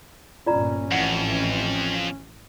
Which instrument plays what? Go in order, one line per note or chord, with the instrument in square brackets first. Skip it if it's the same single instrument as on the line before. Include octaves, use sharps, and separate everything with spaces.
[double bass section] G1 A#2 [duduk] C#4 [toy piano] F4 D5 A#5
[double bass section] A1 E3 [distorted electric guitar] F2 [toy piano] F#5